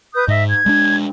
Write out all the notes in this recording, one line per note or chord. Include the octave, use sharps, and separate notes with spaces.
B4 D#6 G6
G#2 D#5 E5
G#6
G#3 A3 D4